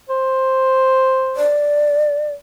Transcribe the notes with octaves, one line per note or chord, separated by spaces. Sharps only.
C5
D5